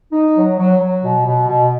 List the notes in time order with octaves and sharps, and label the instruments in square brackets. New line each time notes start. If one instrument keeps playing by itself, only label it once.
[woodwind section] D#4
F#3
F#3
F#3
B2
B2
B2